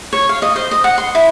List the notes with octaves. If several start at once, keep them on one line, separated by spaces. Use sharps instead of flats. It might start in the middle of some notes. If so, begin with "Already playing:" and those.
C#5
F5
D#5
C5
D#5
F#5
C6
E4